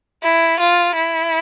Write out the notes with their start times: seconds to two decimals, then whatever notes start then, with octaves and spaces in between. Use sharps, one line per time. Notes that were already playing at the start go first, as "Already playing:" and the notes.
0.23 E4
0.59 F4
0.95 E4